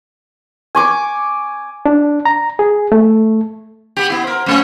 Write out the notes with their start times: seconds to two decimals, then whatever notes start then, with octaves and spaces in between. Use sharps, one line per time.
0.75 G#5 C#6 D6
1.86 D4
2.25 A#5
2.59 G#4
2.92 A3
3.97 B3 G4
4.10 B3 E4
4.24 A#4 C5
4.46 F#2 A3 C#4